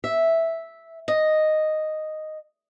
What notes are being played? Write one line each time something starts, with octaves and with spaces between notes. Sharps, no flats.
E5
D#5